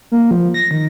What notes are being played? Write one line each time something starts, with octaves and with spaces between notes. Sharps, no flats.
A#3
F3
A#6
D#3